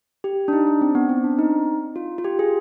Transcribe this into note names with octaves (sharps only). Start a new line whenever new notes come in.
G4
D4
D#4
D4
C4
B3
C4
D4
D#4
F4
F4
G4
G#4